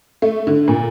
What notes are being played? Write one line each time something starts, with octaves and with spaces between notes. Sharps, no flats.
A3
D3
A#2